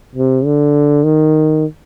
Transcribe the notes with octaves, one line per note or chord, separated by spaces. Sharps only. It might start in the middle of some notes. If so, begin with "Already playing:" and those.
C3
D3
D#3